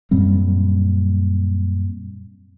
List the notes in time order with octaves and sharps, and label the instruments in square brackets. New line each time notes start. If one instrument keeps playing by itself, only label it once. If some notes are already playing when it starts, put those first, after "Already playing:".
[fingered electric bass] F#2 A#2 G3 C4